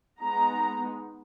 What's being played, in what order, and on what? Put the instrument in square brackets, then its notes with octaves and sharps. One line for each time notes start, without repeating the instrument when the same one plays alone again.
[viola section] G#3 B3 D#4 A#5